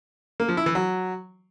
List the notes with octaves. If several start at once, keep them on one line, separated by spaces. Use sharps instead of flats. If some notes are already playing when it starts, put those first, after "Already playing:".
A#3
F3
E4
E3
F#3